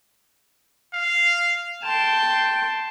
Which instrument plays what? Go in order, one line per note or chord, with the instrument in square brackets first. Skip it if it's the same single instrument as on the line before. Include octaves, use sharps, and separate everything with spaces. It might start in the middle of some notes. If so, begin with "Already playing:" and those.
[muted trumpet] F5
[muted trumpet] G5 [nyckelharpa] A5 C6